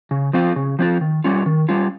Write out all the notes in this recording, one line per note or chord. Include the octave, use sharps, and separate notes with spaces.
C#3
F3 C4 F4
C#3
F3 C4 F4
D#3
G3 C#4 F4
D#3
G3 C#4 F4